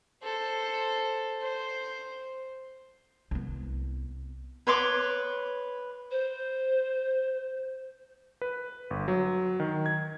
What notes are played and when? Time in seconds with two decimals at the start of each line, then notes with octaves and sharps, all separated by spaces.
0.23 A4 C5
1.41 C5
3.31 C2 B3
4.67 B4 C#5 C6 D6
6.11 C5
8.41 B4
8.90 G1
9.08 F#3
9.60 D#3
9.86 G#6